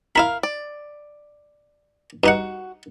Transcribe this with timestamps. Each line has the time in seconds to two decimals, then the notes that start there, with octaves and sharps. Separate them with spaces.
0.15 E4 A#4 F5 B5
0.43 D5
2.24 G2 D#4 F#4 F#5